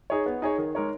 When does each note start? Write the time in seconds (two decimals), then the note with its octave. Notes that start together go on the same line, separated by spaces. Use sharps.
0.10 D#4 G#4 C#5
0.26 B3
0.42 D#4 G#4 C#5
0.58 D#3
0.75 G#3 D#4 A#4 C#5